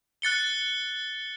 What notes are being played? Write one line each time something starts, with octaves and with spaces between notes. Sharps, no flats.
F#6 A6 C#7 G7